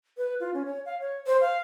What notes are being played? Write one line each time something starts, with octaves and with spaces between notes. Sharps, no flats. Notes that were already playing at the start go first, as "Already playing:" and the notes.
B4
F4
C#4
C#5
F5
C#5
C5
F5